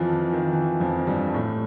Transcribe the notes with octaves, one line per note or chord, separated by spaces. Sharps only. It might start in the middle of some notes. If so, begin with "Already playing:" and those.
Already playing: F2 E3 F3
E3
D#3
E3
F2 F3
G2 G3
A2 A3